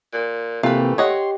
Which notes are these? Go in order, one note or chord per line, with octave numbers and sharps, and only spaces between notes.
A#2
C3 E3 A3 A#3 F4 G4 B4
G4 C#5 D#5 F#5 C6